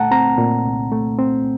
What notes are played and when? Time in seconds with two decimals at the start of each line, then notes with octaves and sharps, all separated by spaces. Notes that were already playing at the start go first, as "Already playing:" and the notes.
Already playing: C2 A#2 A3 F#5 A5 A#5
0.11 C4 A#5
0.38 A#2
0.65 C2
0.92 A3
1.19 C4